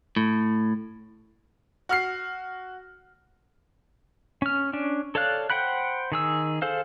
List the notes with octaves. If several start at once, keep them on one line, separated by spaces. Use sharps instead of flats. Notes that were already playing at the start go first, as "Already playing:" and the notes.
A2
F#4 F6 C7
C#4 F6
C#4 D4
A4 C#5 D5 F5 F#6
C5 F#5 G5 B5 F#6
D#3 G#4 E6
G#4 A4 C5 F5